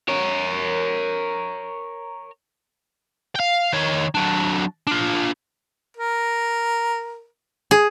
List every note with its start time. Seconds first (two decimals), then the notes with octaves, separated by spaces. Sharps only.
0.09 A#4 C#5
3.36 F5 G5
3.73 D#3 C#5
4.15 F#3 D4
4.87 D4 F4
5.97 A#4
7.71 G#4